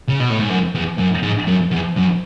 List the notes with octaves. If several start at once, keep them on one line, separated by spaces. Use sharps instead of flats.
C#3
B2
A2
G#2
F#2
E2
F#2
G#2
F#2
E2
F#2